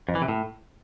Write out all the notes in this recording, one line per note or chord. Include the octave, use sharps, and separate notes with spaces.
F2
E3
C3
A2